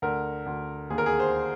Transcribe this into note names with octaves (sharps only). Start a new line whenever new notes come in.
D2 A#4
D2
D#2 G#4
A#4
G#4
C5